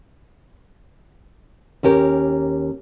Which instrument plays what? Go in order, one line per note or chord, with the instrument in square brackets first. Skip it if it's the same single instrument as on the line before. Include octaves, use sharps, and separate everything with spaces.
[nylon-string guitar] D#2 C#4 G4 A#4